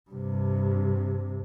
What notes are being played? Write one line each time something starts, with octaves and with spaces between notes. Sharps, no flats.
G2 C3